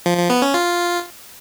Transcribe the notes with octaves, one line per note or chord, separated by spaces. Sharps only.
F3
F3
B3
C#4
F4